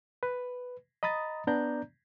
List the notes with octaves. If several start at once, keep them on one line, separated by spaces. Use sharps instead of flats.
B4
D#5 A#5 B5 D#6 A6
B3 D4 D5 A#5 G6